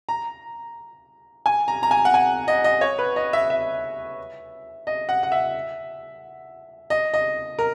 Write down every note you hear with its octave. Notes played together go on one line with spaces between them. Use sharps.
A#5
G#5
A#5
A#5
G#5
F#5
G#5
D#5
D#5
C#5
B4
D#5
E5
E5
D#5
F#5
F#5
E5
D#5
D#5
A#4